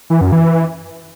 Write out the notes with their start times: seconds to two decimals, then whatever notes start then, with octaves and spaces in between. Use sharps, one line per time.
0.10 E3
0.21 F#2
0.32 E3